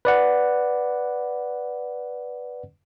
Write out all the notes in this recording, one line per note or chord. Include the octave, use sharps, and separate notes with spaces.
B4 D5 F#5